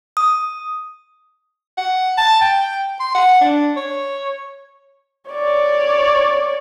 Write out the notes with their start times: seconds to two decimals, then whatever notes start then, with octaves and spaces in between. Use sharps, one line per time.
0.17 D#6
1.78 F#5
2.18 A5
2.41 G5
3.00 C6
3.15 F#5
3.41 D4
3.77 C#5
5.30 C#5 D5